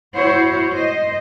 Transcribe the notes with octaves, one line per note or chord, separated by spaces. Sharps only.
E4 F#4 C5 C#5
C5 D#5